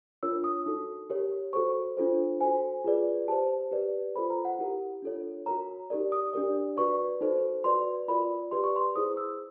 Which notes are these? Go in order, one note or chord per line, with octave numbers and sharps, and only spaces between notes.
D4 F4 A#4 C#5 E6
D#6
D#4 F#4 A4
G4 A#4 C#5
F#4 A4 C5 C#6
D4 F4 A4 C5
F#4 A4 C5 G#5
F4 G#4 B4 D5
G4 C5 A5
G4 B4 D5
F4 A4 C5 B5
A#5
F#5
E4 G4 A#4
D4 F4 A4 C#5
F#4 A#4 C#5 A#5
D#4 G4 A#4 D5
D#6
D4 G4 A#4 D5
F#4 B4 D5 C#6
D#4 F#4 A4 C5
F#4 B4 D5 C6
F4 A#4 D5 B5
G4 B4 D5 C6
C#6
C6
E4 G#4 C5 D#6
E6